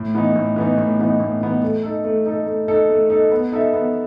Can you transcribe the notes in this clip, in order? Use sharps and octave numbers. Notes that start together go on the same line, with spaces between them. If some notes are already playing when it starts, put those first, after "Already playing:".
Already playing: A2
E3 B3 D#4
A2
E3 B3 D#4
A2
E3 B3 D#4
A2
E3 B3 D#4
A3
D#4 A4
A3
D#4 A4
A3
D#4 A4
A3
D#4 A4
B3
D#4 A4 E5
B3